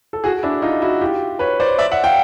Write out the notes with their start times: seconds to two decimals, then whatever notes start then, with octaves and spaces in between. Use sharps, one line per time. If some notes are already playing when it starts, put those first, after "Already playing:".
0.13 A4
0.24 F#4 G#4
0.43 D4 E4
0.62 D#4 F4
0.82 E4 F#4
1.01 F4 G4
1.39 B4 C#5
1.60 C5 D5
1.78 D5 E5
1.91 E5 F#5
2.04 F5 G5